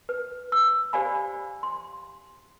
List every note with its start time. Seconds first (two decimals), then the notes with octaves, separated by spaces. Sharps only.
0.09 B4
0.52 E6
0.93 G4 C5 D5 F5 G#5 B5
1.63 C6